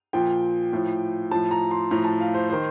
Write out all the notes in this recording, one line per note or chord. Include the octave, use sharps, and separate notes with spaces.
A#2 F3 G5
A2 F3
A2 F3 A5
A#5
C6
A2 F3 A#5
A5
F5
C5
D#3 C5